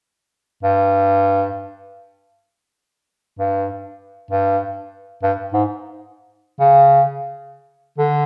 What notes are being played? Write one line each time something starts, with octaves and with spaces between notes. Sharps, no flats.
G2
G2
G2
G2
G#2
C#3
D3